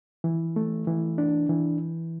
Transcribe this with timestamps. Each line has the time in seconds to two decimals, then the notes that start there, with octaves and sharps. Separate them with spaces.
0.24 E3
0.56 A3
0.87 E3
1.18 D4
1.49 E3